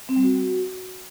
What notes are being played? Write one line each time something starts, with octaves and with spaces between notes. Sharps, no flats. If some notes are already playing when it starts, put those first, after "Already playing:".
C4
G3
F#4